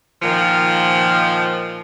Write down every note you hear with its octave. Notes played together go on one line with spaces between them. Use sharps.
A#2 D#3 F3